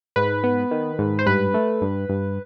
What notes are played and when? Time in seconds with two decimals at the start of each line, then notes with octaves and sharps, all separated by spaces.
0.16 G#2 B4
0.44 B3
0.71 D#3
0.99 G#2
1.19 C5
1.26 G2 B4
1.54 A3
1.81 G2
2.09 G2